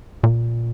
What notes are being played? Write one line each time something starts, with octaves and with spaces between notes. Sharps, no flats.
A#2